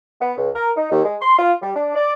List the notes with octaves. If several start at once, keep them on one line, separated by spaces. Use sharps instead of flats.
B3
C#2
A#4
D#4
D#2
G#3
C6
F4
G3
D4
D5